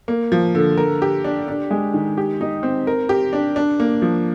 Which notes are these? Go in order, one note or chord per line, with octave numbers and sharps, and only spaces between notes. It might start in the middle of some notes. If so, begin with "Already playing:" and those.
A#3
F3
D3
A#4
G4
D4
D4
G#3
D#3
G4
D#4
C4
A#4
G4
D4
D4
A#3
F3